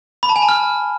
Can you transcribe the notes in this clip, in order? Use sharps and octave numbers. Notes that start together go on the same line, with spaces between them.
B5
A5
G#5
A5
F6